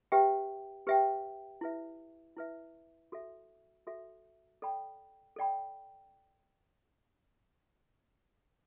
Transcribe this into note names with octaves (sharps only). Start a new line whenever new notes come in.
G4 B4 E5 G5
G4 B4 E5 G5
E4 B4 E5
E4 B4 E5
F#4 A4 E5
F#4 A4 E5
A4 D5 G5 B5
A4 D5 G5 B5